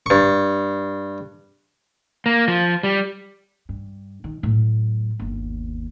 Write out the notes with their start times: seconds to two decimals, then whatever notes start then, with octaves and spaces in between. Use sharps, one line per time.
0.06 G2 C#6
2.26 A#3
2.48 F3
2.83 G3
3.69 G2
4.24 D#3
4.43 A2 F#3
5.20 G1 D#2